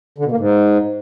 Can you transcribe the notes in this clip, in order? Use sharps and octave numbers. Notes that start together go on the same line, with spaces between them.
D3
B2
A#3
G#2